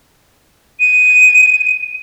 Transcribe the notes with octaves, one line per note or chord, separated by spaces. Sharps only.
D#7